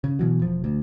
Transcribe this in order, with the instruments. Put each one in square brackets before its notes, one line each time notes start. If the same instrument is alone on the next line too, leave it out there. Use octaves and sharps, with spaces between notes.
[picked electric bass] C#3
B2 E3 F#3
E1 F3
D2